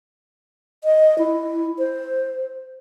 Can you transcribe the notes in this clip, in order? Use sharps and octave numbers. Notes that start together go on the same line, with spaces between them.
D#5
E4
C5